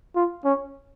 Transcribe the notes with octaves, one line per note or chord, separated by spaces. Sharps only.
F4
C#4